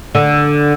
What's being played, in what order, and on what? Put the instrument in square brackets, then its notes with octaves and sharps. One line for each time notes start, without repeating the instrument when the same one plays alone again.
[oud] D3